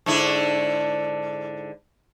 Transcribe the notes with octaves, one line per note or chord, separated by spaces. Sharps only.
G#2 D3 E4